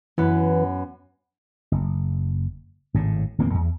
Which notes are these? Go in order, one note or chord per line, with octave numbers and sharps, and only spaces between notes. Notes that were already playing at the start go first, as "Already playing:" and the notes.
F#2 E3 B3
F#1
G#1 A2 C#3
D1 E2 A#3 C4
E2